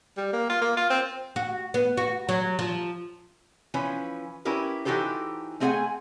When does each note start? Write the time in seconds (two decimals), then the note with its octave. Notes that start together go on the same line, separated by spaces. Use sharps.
0.17 G3
0.33 A#3
0.50 F4
0.62 A#3
0.77 F4
0.90 C4
1.36 F#4
1.74 B3
1.97 F#4
2.29 F#3
2.59 F3
3.74 E3 F3 C#4 B4
4.45 C#4 E4 G4 A#4 B4
4.85 E3 D#4 F#4 G4 A4 C5
5.60 A3 C4 G#4 D#5 F#5 G#5